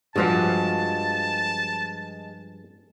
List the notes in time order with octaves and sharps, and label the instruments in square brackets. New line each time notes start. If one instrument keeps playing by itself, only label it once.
[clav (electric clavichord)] G2 F3 [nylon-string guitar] G#3 F4 F#4 [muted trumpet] A5